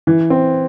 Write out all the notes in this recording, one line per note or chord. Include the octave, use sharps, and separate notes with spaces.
E3
C4